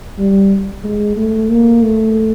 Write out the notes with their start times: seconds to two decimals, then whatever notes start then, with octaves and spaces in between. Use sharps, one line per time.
0.18 G3
0.84 G#3
1.17 A3
1.50 A#3
1.83 A3